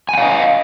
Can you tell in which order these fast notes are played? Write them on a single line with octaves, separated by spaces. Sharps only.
G#5 F#5 F5 D#5